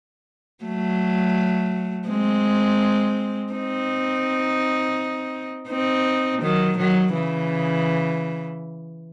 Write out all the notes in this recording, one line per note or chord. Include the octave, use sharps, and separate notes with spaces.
F#3 A3
G#3 C4
C4 D#4
C4 D#4
D#3 F#3
D#3 F#3
C#3 E3